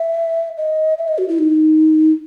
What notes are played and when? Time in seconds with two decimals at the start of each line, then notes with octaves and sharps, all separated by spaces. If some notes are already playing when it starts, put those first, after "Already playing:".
Already playing: E5
0.57 D#5
0.98 E5
1.08 D#5
1.18 F#4
1.28 E4
1.38 D#4